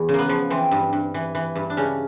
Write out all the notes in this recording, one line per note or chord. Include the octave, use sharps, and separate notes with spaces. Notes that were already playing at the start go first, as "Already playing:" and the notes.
Already playing: E2
C#3
A#3 B3
F3
E3 C4
G2
G2
E3
E3
G2
D4
C#3 C#4